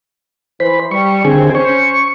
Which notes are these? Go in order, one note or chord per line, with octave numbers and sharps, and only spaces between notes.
E3 C5 B5
G3 C#6
D#2 D3 C4 G#4 G#5
C#4 C5 C#6